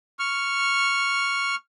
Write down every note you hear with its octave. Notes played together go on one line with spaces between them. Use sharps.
C#6 F6